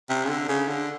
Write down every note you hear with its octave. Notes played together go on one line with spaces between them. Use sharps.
C3
C#3
D3
C#3
D3